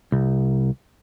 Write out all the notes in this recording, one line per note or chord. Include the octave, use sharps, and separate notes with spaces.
C2